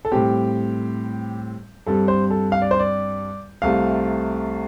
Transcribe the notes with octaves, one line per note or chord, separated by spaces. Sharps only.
A4
A2 G3 C4 G4
G2 G3 C4 A4
C5
A4
F5
D5
C5
D5
C2 C3 A3 F5